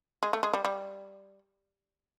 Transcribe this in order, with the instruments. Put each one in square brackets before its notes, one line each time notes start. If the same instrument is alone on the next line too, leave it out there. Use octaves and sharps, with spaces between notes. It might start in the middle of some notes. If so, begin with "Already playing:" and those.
[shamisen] G#3
A3
G#3
G3
G3